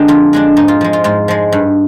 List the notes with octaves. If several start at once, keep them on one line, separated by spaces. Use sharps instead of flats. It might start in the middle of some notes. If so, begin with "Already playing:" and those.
Already playing: D3 G#3 B3 D4 D#4 G4
F2 F4
D3 G#3 D4
G#2 D#4
F4
F3 G#3
F4
G#2 F4
F3 G#3
G2